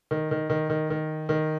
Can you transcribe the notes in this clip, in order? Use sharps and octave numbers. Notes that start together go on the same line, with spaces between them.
D#3
D#3
D#3
D#3
D#3
D#3